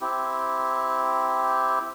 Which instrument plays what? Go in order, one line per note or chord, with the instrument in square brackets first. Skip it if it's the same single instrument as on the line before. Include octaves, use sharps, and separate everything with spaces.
[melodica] C4 E4 G4